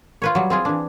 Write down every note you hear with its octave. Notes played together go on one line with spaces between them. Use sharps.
F4 B4 C#5
F#3 G3
C4 F4 G#4
E3 D4